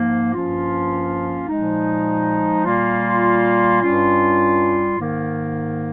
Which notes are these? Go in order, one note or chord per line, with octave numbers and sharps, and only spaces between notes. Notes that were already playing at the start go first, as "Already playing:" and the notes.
Already playing: G#2 F3 A#3
G2 F3 A#3 C#4 F4
A#2 F3 G#3 D#4
A#2 G3 A#3 F4
G2 G3 C#4 F4
G#2 D#3 A#3